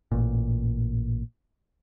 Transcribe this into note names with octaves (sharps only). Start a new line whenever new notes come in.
A1 A#2